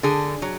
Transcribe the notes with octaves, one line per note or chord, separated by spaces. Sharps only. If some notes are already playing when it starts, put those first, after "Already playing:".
D3 G#4
F#3